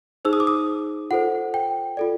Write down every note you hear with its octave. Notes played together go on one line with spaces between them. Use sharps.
D#4 G#4 C5 E6
D#6
D6
D#6
F4 A4 C5 F#5
G5
F4 A4 D5